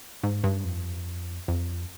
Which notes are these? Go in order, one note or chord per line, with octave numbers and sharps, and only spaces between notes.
G#2
G2
F2
F2